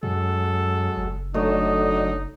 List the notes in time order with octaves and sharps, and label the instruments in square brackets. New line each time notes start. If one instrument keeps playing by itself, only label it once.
[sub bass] F#2 [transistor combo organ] F#3 G#3 [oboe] A4
[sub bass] F#1
[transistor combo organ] F#3 D4 D#5 [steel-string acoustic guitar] A3 A4 C#5 [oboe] D#4